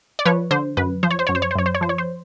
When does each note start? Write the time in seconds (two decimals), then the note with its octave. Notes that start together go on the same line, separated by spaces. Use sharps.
0.19 D5
0.25 F3 B4 C#5
0.51 D3 C5
0.77 F#2 B4
1.03 F3 C5
1.11 C#5
1.19 C5
1.27 F#2 C#5
1.35 C5
1.42 C#5
1.51 C5
1.55 F#2 C#5
1.66 C5
1.75 C#5
1.81 F3 C5
1.89 C#5
1.98 C5